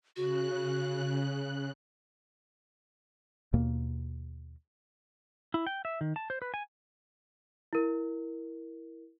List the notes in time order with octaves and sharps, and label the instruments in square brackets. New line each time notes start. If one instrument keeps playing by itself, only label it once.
[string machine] C#3 F#6 [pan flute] F#4
[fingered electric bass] D#2 B2 A#3
[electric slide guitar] E4
G5
E5
D#3
A5
C5
B4
G#5
[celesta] E4 A#4